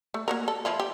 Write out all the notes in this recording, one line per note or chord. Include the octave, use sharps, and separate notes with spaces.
A3
A#3 F#4 A#4
A4
F3 E4 F4
G4